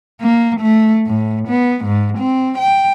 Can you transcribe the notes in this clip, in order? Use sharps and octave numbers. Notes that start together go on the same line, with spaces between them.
A#3
A3
A2
B3
G#2
C4
G5